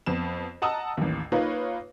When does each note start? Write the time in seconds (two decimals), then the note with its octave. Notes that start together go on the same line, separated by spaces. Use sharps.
0.06 F2 B3 E7
0.62 D#5 F#5 A5 A#5 D#6 E6
0.97 A1 D#2
1.32 A#3 D#4 F4 B4 C#5